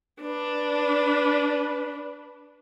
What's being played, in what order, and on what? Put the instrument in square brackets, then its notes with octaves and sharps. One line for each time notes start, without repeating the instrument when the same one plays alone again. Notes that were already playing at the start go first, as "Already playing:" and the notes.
[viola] D4 [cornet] B4